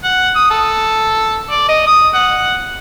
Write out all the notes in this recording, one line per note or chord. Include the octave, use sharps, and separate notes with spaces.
F#5
D#6
A4
D5
D#5
D#6
F#5